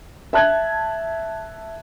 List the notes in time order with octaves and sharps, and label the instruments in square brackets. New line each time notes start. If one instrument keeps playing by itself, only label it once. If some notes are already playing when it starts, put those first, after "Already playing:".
[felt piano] E5 A5 F#6 G#6